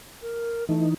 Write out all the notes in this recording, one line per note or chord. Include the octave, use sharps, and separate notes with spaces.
A#4
E3 A3 D#4